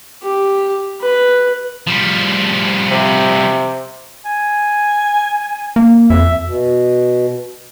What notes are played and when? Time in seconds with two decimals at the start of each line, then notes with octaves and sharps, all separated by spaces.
0.23 G4
1.02 B4
1.87 F3 G3
2.91 C3
4.25 G#5
5.76 A#3
6.10 F2 E5
6.45 B2